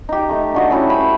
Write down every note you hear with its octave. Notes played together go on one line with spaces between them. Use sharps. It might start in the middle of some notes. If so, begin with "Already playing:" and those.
D#4 G4
A3 D#4
D4 F#4 D#5
C#4 E4 F#4 G4
C5 B5